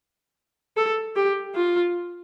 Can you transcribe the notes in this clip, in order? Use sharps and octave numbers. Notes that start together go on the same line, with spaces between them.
A4
G4
F4